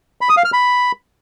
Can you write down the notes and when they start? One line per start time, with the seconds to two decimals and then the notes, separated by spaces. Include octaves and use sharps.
0.21 B5
0.29 D#6
0.37 F5
0.45 F6
0.53 B5